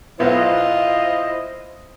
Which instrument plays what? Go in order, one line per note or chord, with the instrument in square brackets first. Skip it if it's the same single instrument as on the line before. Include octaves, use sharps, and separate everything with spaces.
[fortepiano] B1 B3 [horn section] E4 D#5 [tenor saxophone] F4 [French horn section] C5